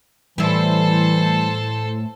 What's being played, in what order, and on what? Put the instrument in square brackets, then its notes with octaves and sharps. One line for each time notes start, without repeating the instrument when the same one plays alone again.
[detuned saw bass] A2 [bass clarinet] E3 [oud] G3 E4 [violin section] A4 C5